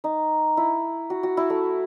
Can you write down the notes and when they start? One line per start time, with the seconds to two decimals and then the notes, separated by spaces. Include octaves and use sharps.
0.04 D#4
0.57 E4
1.10 F#4
1.23 F#4
1.37 E4
1.50 A3